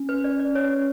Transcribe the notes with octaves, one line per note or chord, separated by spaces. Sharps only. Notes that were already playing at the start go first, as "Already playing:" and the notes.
Already playing: C#4
B4
D5
D5
C#5